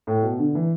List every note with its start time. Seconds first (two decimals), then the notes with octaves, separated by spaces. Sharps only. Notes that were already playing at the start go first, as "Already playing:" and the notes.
0.07 A2
0.22 B2
0.39 D3
0.55 E3